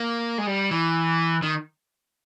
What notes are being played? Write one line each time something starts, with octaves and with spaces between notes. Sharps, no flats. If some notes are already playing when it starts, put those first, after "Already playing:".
Already playing: A#3
G#3
G3
E3
D#3